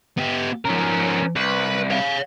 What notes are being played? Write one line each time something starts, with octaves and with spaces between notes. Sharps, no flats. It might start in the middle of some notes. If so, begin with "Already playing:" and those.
B3 G4
C#3 F3 C#4 A#4
C2 B4
C#5 F5